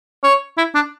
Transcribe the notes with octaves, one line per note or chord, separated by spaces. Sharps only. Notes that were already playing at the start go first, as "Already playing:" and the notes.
C#5
E4
D4